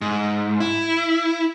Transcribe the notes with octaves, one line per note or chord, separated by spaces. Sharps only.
G#2
E4